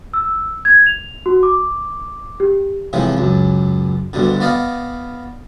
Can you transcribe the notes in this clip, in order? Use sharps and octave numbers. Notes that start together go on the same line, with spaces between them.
E6
G#6
F7
F#4
D6
G4
A2 C3 E3 F3 G#3
C#2 F#2
D2 G2 B2 D3
B3 D5 D#5 F5 G5